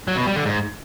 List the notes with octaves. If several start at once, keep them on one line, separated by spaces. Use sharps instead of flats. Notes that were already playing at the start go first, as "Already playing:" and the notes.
F#3
B2
G3
D3
G#2